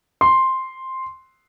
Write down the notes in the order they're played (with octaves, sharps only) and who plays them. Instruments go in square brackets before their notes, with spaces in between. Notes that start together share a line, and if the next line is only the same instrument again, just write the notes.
[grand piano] C6